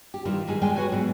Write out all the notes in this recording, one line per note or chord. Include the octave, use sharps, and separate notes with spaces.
G4
D#3 E3 G3 F4 A#4
G#2 D#3 D#4 G#4
F2 G3 G#3 D5 G5 G#5
F#4 B4 C#5 G#5
G#2 B2 F#3 G3